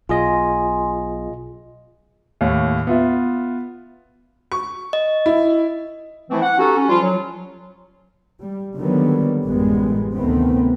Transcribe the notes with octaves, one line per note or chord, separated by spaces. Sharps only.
B1 F4 G#4 D#5 G#5 C6
D#2 A2
B3 F4 E5
C#6
D#5
E4
E3 F3 A3 C4 E4
F#5
C#4 D#4 F#4 G4 A4
C#4
F3 G3 F4
F#3
G3
D3 D#3 F#3 G3 A#3 B3
A1 F#2 G3 G#3 B3
D2 C3 D#3 A3 B3 C4